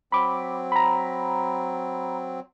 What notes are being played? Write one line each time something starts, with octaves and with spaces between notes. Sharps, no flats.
F#3 C4 B5 D6
A#5 B5